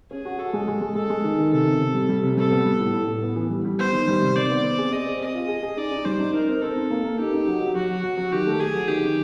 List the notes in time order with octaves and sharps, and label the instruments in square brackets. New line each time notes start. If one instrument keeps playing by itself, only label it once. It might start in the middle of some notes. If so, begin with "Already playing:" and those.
[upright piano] C#4 [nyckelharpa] G#4
[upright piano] F#4
[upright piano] F#4 [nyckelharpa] A4
[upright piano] G#3
G#3
G#3
[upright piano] G#3 [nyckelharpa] A4
[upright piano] G#3
D#3
D#3
[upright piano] C3 [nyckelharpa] A4
[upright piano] C3
C3
G3
G3
C3
[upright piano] G3 [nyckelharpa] A4
[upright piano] B3
G3
A2
A2
A2
B3
E3
G3
G3
[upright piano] B3 [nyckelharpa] C5
[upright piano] D#3
G3
C3
[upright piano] D#3 [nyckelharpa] D5
[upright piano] B3
C4
G#4
[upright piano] G#4 [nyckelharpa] D#5
[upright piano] C4
[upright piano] G#4 [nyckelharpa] D#5
[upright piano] F4
G#4
G#4
[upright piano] D#4 [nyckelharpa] D5
[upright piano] D#4
[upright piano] G3 [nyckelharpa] C5
[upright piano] D#4
[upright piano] D#4 [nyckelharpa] A#4
[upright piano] C4
[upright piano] C4 [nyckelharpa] A4
[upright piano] D#4
A#3
A#3
[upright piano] D#4 [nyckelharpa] G4
[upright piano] D#4
F#3
F#3
[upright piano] F#3 [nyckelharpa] F#4
[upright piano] F#3
F#3
F#3
[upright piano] D#3 [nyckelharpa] G4
[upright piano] A3
[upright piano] A3 [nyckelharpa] G#4
[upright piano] F#3
[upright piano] D#3 [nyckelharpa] G4
[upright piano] D#3